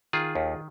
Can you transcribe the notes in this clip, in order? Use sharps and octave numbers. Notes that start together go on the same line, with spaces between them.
D#3 F4 G#4
D#2